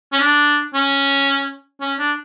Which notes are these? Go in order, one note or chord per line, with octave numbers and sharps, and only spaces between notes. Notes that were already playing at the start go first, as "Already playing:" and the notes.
C#4
D4
C#4
C#4
D4